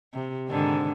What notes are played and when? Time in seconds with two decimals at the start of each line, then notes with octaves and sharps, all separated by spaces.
0.14 C3
0.48 G#2 D3 D#3